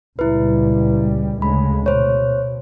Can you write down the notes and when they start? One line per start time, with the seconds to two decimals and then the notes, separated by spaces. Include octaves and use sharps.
0.19 C#2 A#2 G3 E4 B4
1.42 D2 C#3 G#3 B5
1.86 B2 C5 C#5